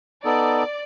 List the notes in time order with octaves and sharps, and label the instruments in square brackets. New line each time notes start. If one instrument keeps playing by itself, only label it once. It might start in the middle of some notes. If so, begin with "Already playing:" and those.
[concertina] B3 D#4 A4 [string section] D5